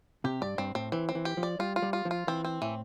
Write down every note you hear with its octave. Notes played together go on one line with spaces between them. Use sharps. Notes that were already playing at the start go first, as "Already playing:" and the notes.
C3 G4
G2 D5
G2 C4
A2 C4
E3 C4
C4
E3
G4
F3
D5
G3 F4
F4
G3
F4
F3
F4
E3 C4
C4
A2 E3